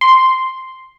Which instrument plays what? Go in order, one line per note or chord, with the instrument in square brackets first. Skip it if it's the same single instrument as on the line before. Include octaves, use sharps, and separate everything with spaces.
[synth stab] C6